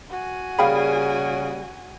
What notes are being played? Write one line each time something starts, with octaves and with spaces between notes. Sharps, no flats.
F#4 G#5
C#3 G3 A#3 G#4 F5 G5 B5